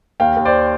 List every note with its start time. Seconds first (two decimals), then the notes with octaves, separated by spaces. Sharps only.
0.20 D#2 F5 G5
0.36 D#2
0.45 C5 D5